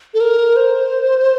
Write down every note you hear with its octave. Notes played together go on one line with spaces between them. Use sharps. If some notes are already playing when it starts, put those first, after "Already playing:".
A4
A#4
C5